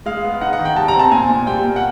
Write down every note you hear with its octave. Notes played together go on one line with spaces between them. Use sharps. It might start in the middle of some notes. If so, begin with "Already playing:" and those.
G#3 F5
B3
D#4 F#5
F#5
D#3
G5
G3 A5
A#5
C4 A5
A#2 G#5
A#2
G3 G5
A#3
F#5